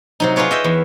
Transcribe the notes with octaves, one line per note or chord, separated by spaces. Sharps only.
C3 F#3 D#4
F4 G#4 B4 C#5 D5
D#5 E5 G5
E2